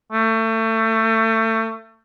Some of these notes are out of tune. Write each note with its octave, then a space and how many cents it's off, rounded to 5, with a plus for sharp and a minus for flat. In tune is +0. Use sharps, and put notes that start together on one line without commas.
A3 +30